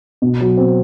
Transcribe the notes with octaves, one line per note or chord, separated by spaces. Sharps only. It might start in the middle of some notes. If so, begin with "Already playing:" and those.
B2
F#3
C4